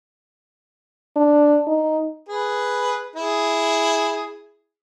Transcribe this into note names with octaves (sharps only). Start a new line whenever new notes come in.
D4
D#4
G#4 B4
E4 G#4